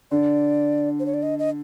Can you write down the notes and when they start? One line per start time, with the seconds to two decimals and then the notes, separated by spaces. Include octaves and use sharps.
0.11 D3 D5
1.00 C5
1.06 C#5
1.14 D5
1.23 D#5
1.39 D#5